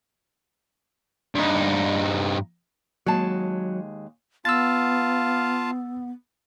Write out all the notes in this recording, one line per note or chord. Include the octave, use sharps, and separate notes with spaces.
G2 D#4
D#2 F#3 G#3 A5
B3 F4 F5 A5 E6 A6